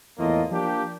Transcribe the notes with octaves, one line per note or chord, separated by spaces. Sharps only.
E2 A2 A#3 F4 D#5
F3 A#3 D4 G4